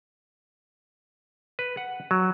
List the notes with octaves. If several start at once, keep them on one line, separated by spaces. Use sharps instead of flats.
B4
F#5
F#3